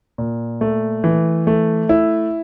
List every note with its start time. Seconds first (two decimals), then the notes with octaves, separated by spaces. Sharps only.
0.18 A#2
0.61 A3
1.04 E3
1.47 A3
1.89 E4